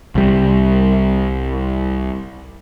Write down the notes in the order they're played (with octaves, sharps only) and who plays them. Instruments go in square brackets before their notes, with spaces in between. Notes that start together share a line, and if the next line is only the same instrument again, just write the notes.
[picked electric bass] C2 G3